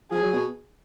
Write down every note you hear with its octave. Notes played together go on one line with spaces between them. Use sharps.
F3 G#4
F#3
B2